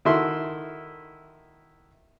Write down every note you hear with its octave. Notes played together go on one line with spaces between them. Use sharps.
D#3 E4 F#4 A4 E5 C6